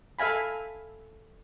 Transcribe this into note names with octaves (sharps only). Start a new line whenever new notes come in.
A4 E5 F5 G#5 B5